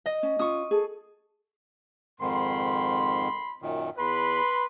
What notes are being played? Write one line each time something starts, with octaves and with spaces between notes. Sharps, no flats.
D#5
C#4
C#4 F4 C#6 D#6
G#4 A4
F2 G#2 D#3 B5 C6
F#2 A#2 D#3
E2 B4 B5 C6